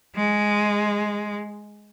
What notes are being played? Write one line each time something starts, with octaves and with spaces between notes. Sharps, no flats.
G#3